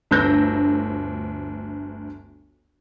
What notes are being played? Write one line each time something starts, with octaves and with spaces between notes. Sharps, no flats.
G1 D2 E6 G6 A#6